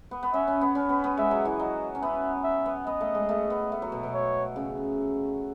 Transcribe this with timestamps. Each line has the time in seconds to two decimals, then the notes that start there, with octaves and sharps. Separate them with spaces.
0.11 B3
0.23 B3
0.33 C#4 E5
0.48 C#4
0.61 B3
0.75 C#4
0.89 B3
1.04 B3
1.18 G#3 E5
1.31 F#3
1.45 E3
1.59 F#3 D#5
1.95 C#4
2.02 B3 E5
2.44 E5
2.66 B3
2.87 B3 D#5
3.01 A3
3.15 G#3
3.29 A3
3.50 B3
3.72 A3
3.82 F#3
3.92 B2
4.03 B2
4.14 C#5
4.56 C#3